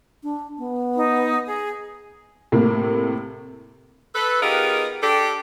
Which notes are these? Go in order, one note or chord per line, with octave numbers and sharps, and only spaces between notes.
D4
B3
D#4
G#4
A2 C3 A#3
A4 B4
B3 D#4 F4 G4 G#4 A#4
D4 G4 A4